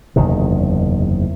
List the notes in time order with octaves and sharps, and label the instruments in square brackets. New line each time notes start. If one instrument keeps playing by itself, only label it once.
[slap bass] F#1 E2 C3 D#3